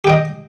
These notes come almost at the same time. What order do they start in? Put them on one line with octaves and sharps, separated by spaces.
G4 G5 D#5